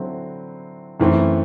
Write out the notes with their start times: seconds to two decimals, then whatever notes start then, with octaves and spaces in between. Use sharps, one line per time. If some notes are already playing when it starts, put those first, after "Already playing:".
Already playing: D3 F#3 C4 E4
1.00 F#2 E3 A3 C4